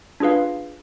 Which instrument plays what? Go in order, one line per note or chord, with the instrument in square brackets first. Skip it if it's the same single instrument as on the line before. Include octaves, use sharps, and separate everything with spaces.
[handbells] D4 F4 G#4 B4 F5